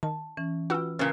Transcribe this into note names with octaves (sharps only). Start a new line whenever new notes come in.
D#3 A5
E3 C#4
F4 F#4 B4 G5 E6
A#2 C#3 C4 C#4 A#4 B4